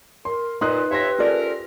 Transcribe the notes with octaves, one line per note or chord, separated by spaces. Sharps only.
A#4 C6
A#2 D#4 B4 C6 D#6 F#6
F3 G4 C#5 E5 C6 A#6
C3 C#4 F4 A4 A#4 D5